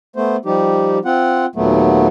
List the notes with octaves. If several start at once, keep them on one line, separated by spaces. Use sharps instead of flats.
A3 B3 C5
F3 G3 D#4 G4
C4 F4 F#5
D#2 A#2 F#3 A3 B3